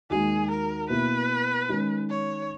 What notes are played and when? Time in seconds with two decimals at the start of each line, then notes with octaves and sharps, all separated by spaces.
0.10 D#2 D#3 G#3 D#4 F#4 G#4
0.50 A#4
0.90 B2 A#3 E4 B4
1.69 D#3 G#3 C#4
2.10 C#5